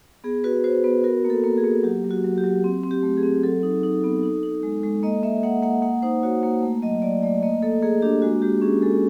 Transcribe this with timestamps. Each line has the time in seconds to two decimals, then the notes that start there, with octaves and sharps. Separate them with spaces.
0.24 B3 G#4
0.44 F#4 B4
0.64 F#4 C5
0.84 B3 B4
1.04 F#4 A#4
1.25 A#3
1.30 A4
1.44 A#3
1.58 G#4
1.64 A#3
1.83 F#3 G4
2.04 F#3
2.10 F#4
2.24 F#3
2.38 G4
2.44 F#3
2.64 C4
2.83 C4
2.91 G4
3.03 A3
3.17 G#4
3.23 C4
3.43 F#3 A4
3.63 D#4
3.83 D#4
4.04 B3
4.23 D#4
4.43 D#4
4.63 G#3
4.83 G#3
5.03 A#3 D#5
5.23 A#3 E5
5.43 A#3 F#5
5.62 A#3 F#5
5.82 A#3 F#5
6.02 D#4 C5
6.23 F#4 C#5
6.43 A#3
6.63 A3
6.82 F#3 D#5
7.02 F#3 D5
7.22 A3 D5
7.42 A#3 D#5
7.63 A#3 A4
7.82 A#3 G#4
8.02 D4 G4
8.22 G#3 F#4
8.42 G#3 G4
8.62 C#4 G#4
8.82 G#3 A4